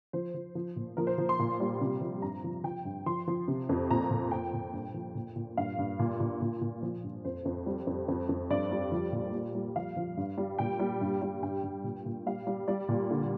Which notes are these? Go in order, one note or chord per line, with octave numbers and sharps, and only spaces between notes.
F3 C5
F3
F3
A#2
F3 A#4
C5
F3
C6
A#2
G3
C3
F3
G2 A#5
F3
F3 G5
G2
F3 C6
F3
C3
F2
A#2 A#5
A#2
A#2 G5
A#2
G2
F3
A#2
A#2
G2 F5
G2
A#2
A#2
A#2
A#2
F3
G2
F2 C5
F2
G3
F2
F2
F2
G2 D5
G3
F3
A#2
G3
G3
F3 F5
F3
G2
G3
A#2 G5
G3
G2
G3
G2 G5
G2
A#2
A#2
G3 F5
G3
G3 D5
A#2
D3